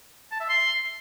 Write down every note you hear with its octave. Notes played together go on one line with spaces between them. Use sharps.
A5
E5
C6